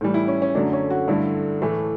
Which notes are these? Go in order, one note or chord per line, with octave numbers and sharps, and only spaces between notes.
A2 E3 G3
E4
C#4
C#4
F#2 D3 F#3 A3 D4
C#4
F#4
G2 D3 A3 E4
A2 E3 A3